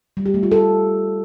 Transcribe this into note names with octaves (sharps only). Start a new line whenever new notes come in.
G3
G4
A3
F4
A4